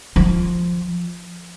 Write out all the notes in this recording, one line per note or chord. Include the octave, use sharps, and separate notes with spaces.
F3